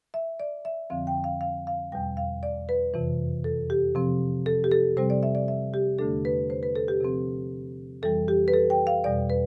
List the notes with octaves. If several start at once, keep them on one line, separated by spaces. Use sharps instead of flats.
E5
D5
E5
F2 D3 F3 C4 F5
G5
F5
F5
F5
E2 B2 G3 G5
F5
D5
B4
F2 C3 E3
A4
G4
C3 F3 C4
A4
G4
A4
C3 G3 C4 C5
D5
E5
D5
E5
G4
E2 D3 A3 D4 A4
B4
C5
B4
A4
G4
C3 F3 C4
F2 E3 G3 A4
G4
B4
A4
G5
F5
E2 B2 G3 D5
B4